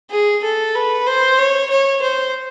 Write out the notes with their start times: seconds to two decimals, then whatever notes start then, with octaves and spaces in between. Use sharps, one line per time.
0.10 G#4
0.43 A4
0.75 B4
1.07 C5
1.39 C#5
1.70 C#5
2.02 C5